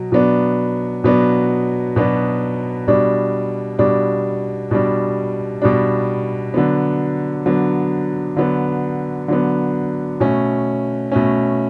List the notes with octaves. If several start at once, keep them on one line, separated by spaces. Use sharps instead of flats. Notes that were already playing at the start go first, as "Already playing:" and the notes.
Already playing: B2 F#3
B2 F#3 B3 D4
B2 F#3 B3 D4
B2 F#3 B3 D4
B2 G3 D4
B2 G3 D4
B2 G3 D4
B2 G3 D4
D3 F#3 B3
D3 F#3 B3
D3 F#3 B3
D3 F#3 B3
B2 A3 C#4
B2 A3 C#4